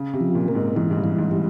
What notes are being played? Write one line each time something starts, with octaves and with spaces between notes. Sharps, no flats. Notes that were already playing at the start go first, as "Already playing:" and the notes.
Already playing: C#3
C3
F3
A#2
A#3
G#2
G#2 E3
G#2
G2
E3
G#2
G3